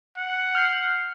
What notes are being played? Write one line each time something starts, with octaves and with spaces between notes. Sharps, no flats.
F#5
F6 G6 C7